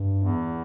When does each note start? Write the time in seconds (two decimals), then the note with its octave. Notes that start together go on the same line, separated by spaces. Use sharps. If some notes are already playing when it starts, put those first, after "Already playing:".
Already playing: G2
0.23 E2